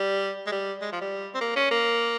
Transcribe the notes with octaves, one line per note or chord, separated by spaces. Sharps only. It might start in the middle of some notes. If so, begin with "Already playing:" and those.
Already playing: G3
G#3
G3
G#3
F3
G3
C4
A#3
C#4
A#3